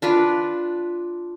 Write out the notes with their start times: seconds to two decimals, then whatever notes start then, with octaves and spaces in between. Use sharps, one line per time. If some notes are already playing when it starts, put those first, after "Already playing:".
0.02 D4 F4 B4